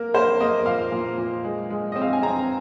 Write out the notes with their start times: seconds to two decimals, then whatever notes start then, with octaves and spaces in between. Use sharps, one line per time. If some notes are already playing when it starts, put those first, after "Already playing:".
Already playing: A#3 A#4
0.14 A#3 C5
0.40 A#3 D#5
0.66 A#2 F5
0.92 A#2
1.18 A#2
1.44 G#3
1.70 G#3
1.92 C4 D#5
2.02 F5
2.13 G#5
2.22 C4 A#5